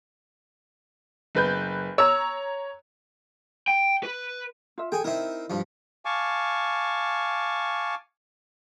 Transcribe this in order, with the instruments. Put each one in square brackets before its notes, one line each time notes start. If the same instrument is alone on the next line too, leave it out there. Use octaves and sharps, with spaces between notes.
[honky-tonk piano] F#1 B4 G6
[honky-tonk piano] C#5 A#5 [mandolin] E6
[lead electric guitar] G5
B4
[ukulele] F4 E5
[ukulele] G#4 A4 [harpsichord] G5 G#5
[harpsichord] C4 D#4 A#4 [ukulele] E4 E5
[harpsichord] G2 F3
[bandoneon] F5 G#5 A5 C#6 D6